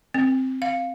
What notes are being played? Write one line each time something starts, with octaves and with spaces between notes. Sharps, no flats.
C4
F5